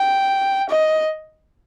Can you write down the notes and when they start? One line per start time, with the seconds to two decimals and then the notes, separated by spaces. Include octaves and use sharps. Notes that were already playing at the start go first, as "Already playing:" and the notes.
Already playing: G5
0.69 D#5